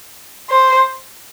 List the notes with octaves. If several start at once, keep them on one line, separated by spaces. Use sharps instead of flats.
C5